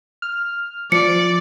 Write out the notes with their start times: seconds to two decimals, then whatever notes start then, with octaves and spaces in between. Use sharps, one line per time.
0.22 F6
0.92 F3 D5 C#7